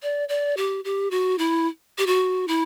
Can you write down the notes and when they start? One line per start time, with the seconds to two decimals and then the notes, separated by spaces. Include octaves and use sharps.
0.03 D5
0.29 D5
0.57 G4
0.84 G4
1.11 F#4
1.38 E4
1.98 G4
2.06 F#4
2.48 E4